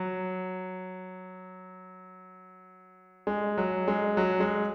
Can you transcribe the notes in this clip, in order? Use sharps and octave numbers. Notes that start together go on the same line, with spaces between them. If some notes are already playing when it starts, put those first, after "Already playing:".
Already playing: F#3
G#3
F#3
G#3
F#3
G#3